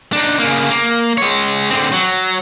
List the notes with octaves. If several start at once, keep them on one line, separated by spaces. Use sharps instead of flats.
D4 D#4
C#3 A#3
A#3
G#3 C#5
D3 C4
F#3